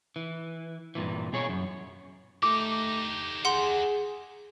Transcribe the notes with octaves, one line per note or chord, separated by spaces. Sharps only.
E3
G2 A#2 E3
B2 G#4 C#5
F#2
A3 D#4 G4 D6
G#4 F#5 C6